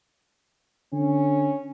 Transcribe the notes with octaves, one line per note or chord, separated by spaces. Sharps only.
D3 C#4